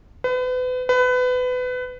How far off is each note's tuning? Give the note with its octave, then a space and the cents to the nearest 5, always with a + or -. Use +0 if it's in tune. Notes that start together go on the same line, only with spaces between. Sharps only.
B4 +35
B4 +25